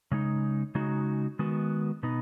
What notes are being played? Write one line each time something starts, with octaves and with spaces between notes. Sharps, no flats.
C#3 G#3 D#4
C#3 G#3 D#4 F#4
D#3 G#3 B3 F#4
B2 B3 D#4